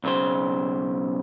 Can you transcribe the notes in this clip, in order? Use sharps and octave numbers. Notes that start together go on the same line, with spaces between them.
B1 C#3 C5